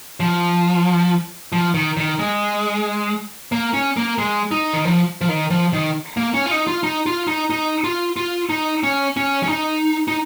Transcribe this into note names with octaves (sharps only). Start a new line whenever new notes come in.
F3
F3
D#3
D#3
G#3
A#3
C#4
A#3
G#3
D#4
D#3
F3
F3
D#3
F3
D#3
A#3
C#4
F4
D#4
F4
D#4
F4
D#4
D#4
F4
F4
D#4
C#4
C#4
C#4
D#4
D#4